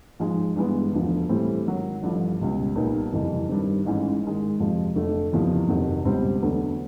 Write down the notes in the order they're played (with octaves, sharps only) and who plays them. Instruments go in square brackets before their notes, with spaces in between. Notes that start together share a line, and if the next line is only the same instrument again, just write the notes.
[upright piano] G#2 F3 G#3
G2 E3 G#3 B3
E1 D2 D3 F3
A2 E3 G3 C4
G#2 D#3 F#3
A1 G2 D3 F3
C#2 B2 G3
B1 A#2 G3 B3 D#4
F#1 F2 C3 E3 G3
G2 D#3 G3 C4
A1 G#2 E3 G#3 C#4
G#2 D#3 G#3
F2 C3 F3 G#3
F1 F2 D3 F#3 A3
F#1 E2 C3 F3
F1 F2 C3 D#3 F#3
C#2 B2 G3 C4
E1 D2 D3 F#3 B3